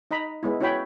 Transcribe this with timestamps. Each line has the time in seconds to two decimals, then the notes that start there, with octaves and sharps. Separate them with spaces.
0.11 D#4 D#5 A#5 B5
0.43 G#3 B3 E4
0.61 C#4 E4 F#4 C#5 G5 B5